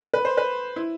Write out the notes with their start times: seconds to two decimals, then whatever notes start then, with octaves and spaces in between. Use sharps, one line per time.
0.14 B4
0.25 C5
0.37 B4
0.76 E4